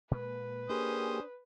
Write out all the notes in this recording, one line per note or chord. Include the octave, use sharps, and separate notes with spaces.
A#2 G#3 A#3 B4
A#3 C#4 D4 G4 G#4 C5 D#6